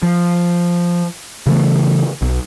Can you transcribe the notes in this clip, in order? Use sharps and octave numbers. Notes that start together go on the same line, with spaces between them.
F3
C#3 E3 A3
B1